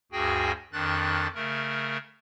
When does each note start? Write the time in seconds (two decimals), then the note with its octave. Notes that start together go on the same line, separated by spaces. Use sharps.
0.12 D2 G2 F#4 G#4 G5 G#5
0.73 F2 D#3 D4 F#6 A6
1.35 C#3 A3 A#4